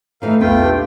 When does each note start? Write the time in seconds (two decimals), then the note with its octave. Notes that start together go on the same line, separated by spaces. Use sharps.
0.22 D#3 E3 A3 A#4 F5
0.41 A#1 E2 A3 B3 F4 B4 G5
0.62 D4 G4